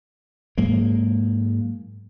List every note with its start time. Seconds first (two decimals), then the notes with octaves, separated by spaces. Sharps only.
0.58 G#2 F#3 G#3 A#3